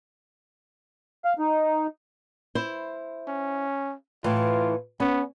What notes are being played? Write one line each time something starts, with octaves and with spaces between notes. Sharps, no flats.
F5
D#4
E4 C5
C#4
A2 E3 F4
B3 C#4